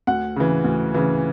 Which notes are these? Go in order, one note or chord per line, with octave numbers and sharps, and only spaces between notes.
D2 F#5
C#3 E3
D2
C#3 E3